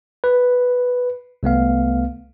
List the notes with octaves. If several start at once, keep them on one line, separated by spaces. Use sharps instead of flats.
B4
C2 A3 B3 F5